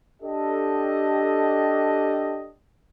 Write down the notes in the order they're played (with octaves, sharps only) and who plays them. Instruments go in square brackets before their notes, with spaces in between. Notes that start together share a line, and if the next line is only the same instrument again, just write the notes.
[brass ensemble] D4 G4 A4 D#5